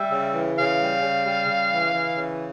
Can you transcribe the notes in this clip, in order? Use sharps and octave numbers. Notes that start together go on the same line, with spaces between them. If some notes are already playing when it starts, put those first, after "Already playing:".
Already playing: G3 E5
C#3
E3
C#3 F5
G3
C#3
G3
C#3
E3
E3
C#3